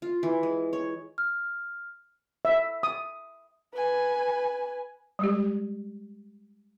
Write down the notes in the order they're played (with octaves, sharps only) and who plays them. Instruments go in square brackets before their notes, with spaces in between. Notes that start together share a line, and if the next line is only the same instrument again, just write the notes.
[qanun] F4
E3
G#3
C#5
[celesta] F6
[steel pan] E5
D#6
[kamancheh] B4 G#5
[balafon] G3 G#3 G4